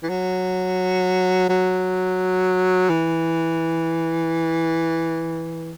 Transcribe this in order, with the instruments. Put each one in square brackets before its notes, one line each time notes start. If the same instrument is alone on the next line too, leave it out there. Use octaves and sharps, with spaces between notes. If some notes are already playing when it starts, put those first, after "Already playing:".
[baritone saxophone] E3
F#3
F#3
E3